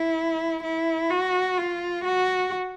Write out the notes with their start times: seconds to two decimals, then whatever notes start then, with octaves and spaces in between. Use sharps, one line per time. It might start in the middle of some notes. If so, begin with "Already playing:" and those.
Already playing: E4
0.63 E4
1.10 F#4
1.58 F4
2.04 F#4